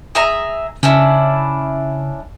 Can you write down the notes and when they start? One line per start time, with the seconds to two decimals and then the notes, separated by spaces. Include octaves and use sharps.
0.15 G#4 E5 A#5
0.83 C#3 C#4 D4 E4